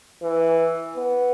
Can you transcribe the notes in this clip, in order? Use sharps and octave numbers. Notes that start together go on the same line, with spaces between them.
E3
B3